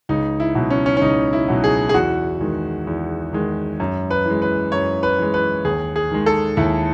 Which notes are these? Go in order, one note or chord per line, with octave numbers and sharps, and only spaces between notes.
C#2 D#4
E4
B2 F#3
C#4
C#4
C#4
C#2 D#4
E4
B2 F#3
G#4
G#4
E2 F#4
D#3 G#3
E2
D#3 G#3
F#2
B4
E3 G#3
B4
F#2 C#5
B4
E3 G#3
B4
D#2 G#4
G#4
D#3 G#3
A4
D#2 E4